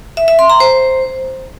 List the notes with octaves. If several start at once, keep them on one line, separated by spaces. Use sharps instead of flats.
E5
E5
C6
A#5
C5